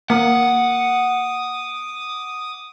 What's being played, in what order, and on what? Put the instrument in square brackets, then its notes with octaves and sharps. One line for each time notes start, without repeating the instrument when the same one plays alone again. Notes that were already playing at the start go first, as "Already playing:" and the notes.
[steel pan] A#3 [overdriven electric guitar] F#5 [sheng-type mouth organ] D6 D#6